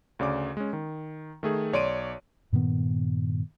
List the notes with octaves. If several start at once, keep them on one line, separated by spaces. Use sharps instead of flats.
D2 C#3 D5 D6
G#3 C#4
D#3
D#3 A3 G#4
B1 C#5 D5 C6 D7 D#7
G2 A#2 D#3 B3